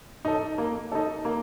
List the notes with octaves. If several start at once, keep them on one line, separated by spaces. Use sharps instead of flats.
D#4 A4
A#3
D#4 A4
A#3